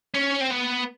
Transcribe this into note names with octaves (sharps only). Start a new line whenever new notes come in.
C#4
C4
B3